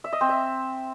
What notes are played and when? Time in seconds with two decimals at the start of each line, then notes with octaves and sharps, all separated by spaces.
0.04 E5
0.13 D#5
0.21 C4
0.29 E5